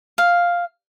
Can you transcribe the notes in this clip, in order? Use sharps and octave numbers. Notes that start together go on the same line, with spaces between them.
F5